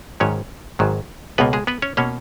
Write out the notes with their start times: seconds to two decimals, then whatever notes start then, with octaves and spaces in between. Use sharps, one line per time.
0.20 G#1 G#2 D#3 F#3 C#4 C#5
0.79 G#1 G#2 D#3 F#3
1.38 C#2 B2 A#3 B3 B4
1.53 G#3 G#4
1.67 B3 B4
1.82 C#4 C#5
1.97 B2 A#3 C#4 C#5